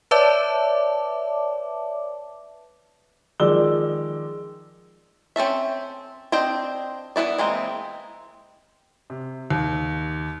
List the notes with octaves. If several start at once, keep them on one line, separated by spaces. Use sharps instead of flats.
B4 C#5 D5 E5 A5 D6
D#3 F3 G#3 D5 E6 G7
C4 C#4 A4 E5
C4 D4 C5 D#5 G5
E3 B3 E4 D5
E3 G#3 A#3 C4
C3
D#2